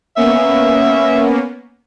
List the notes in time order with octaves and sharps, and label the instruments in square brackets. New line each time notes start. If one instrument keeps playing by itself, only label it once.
[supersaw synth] A#3 B3 C#4 [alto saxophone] E5